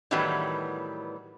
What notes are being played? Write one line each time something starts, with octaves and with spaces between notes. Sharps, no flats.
A2 D#3 E3 F#3 G3 B3